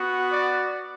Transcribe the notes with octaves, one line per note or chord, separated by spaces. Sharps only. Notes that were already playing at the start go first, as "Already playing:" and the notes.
Already playing: B3 F#4
D5